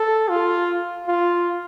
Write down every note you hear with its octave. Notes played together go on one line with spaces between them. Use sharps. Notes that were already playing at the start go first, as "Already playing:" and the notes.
Already playing: A4
F4
F4